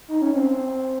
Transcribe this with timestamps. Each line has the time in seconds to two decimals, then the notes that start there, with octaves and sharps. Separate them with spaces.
0.08 D#4
0.22 C#4
0.35 C4
0.50 C4